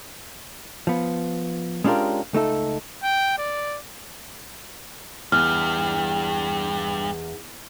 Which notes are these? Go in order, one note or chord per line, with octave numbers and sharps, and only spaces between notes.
F3 B3
G#3 C#4 D4 F4 G4 A#4
C#2 A3 D#4 A4
G5
D5
E2 G2 F6